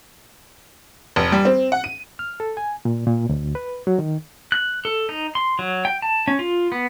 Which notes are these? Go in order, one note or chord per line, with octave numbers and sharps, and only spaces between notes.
F1
G3
C4
F#5
D#7
F6
A4
G#5
A#2
A#2
D2
B4
F#3
D#3
F#6
A4
D#4
C6
F#3
G5
A5
C#4
F4
B3